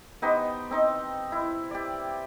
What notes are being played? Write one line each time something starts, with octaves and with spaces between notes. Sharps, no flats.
B3 D#4 G4 C5
C4 D#4
E4
G4 D5